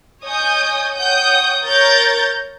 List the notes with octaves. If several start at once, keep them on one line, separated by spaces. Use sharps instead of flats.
C#5 D#5 G#5 D#6 G6
C#5 F#5 G5 D#6 G6
A#4 C#5 G6 A6